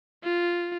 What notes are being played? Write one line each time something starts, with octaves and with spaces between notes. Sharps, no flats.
F4